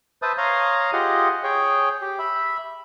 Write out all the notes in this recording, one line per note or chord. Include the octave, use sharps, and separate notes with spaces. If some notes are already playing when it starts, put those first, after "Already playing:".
B4 C5 E5 A5 D#6
C#5 F5 A#5 C6 D#6
F4 G4 G#4 D#5 F#5
G#4 C#5 G5
G4
E5 B5